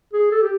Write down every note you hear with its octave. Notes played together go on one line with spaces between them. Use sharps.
G#4
A4
G4